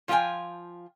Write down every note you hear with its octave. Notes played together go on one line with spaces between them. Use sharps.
F3 F4 G4 B4 G5 G#5